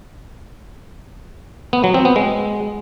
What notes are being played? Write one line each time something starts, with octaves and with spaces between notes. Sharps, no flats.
B3
F#3
C4
B3
G#3